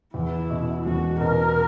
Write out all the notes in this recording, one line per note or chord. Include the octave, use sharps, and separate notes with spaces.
E2 E4
B2
E1 F#4
B2 A#4